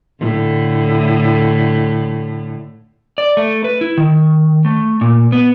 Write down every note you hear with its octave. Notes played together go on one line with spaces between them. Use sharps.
A2 D3
D5
A3
B4
E4
D#3
A3
A#2
B3